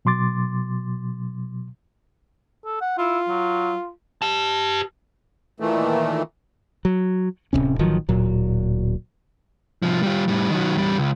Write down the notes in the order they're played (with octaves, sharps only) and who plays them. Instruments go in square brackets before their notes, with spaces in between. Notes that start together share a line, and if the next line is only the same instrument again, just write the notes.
[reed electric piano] B2 F#3 C6 D6 A6
[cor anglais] A4
F#5
[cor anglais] E4 [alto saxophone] F4
[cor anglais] F#3
[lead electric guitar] G4 A5
[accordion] A#2 D#3 E3 A3
[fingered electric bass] F#3
D1 G#1 C3 C#4
A1 D#3 F3 F#3
D1 A#2 F#3
[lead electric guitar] C2 F3
G3 F4
A2 G3
D#3 F#3
E2 G3
C#2